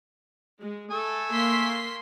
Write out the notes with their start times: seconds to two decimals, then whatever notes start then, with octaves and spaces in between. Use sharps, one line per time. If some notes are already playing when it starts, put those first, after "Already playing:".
0.60 G#3
0.91 A3 A4 G#5 E6
1.31 A#3 C6 B6